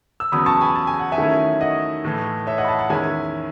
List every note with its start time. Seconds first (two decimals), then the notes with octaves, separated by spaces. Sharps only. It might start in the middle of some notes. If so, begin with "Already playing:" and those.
0.20 E6
0.32 E2 C#3 F#3 B3 B5 D#6
0.46 A5 C#6
0.60 G#5 B5
0.75 A5
0.87 G#5
0.99 F#5
1.12 E5 G#5
1.18 D#3 F#3 A3 C#4 E4
1.61 D#5 F#5
2.04 A2 E3 A3
2.47 C#5 E5
2.58 D#5 F#5
2.64 B5
2.68 F#5 A5
2.79 F#5 A5
2.89 E2 D#3 G#3 C#4 E4 E5 G#5